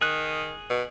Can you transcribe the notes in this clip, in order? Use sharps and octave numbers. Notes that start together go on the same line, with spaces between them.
D#3 G#4 F#6
B2